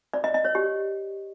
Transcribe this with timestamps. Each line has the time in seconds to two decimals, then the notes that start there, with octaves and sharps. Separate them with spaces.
0.14 D5
0.24 D#5
0.34 D#5
0.45 C#5
0.55 G4